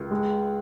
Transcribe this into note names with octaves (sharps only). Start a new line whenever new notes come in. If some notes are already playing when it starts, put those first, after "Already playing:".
Already playing: C#2
G#3